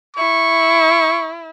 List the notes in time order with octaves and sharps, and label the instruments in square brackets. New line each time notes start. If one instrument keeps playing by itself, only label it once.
[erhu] E4 [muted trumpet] C#6